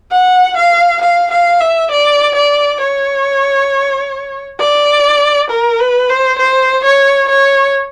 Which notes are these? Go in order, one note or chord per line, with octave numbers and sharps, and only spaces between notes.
F#5
F5
F5
F5
E5
D5
D5
C#5
D5
A#4
B4
C5
C5
C#5
C#5